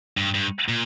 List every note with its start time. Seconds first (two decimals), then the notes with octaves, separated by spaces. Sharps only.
0.17 G2
0.34 G2
0.68 A#2